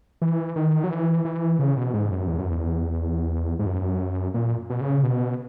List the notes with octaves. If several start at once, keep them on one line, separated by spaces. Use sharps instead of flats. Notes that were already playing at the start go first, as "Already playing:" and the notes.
E3
D#3
F#3
E3
E3
C#3
B2
G#2
F#2
E2
F#2
E2
G#2
F#2
A#2
B2
C#3
B2